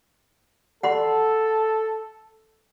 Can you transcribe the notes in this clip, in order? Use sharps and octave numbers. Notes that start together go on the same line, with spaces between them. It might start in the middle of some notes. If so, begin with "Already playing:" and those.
A4 F#5 B5 C6